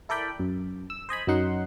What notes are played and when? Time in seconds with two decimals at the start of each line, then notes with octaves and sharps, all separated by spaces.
0.09 E4 A4 A#4 D5 G5 B5
0.39 F#2
0.90 E6
1.09 C5 D#5 G#5 B5
1.27 F#2 F#3 D#4 F#5 C6